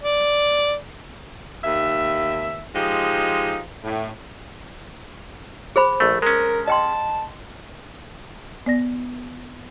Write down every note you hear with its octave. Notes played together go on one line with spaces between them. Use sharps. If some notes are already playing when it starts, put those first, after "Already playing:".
D5
D#2 E5
F3 G#3 D#4 G4
A2
G#4 C5 B5
A#1 A3
G#3 C#4 A#4
D#5 G5 A5 C6
B3 D5 A#6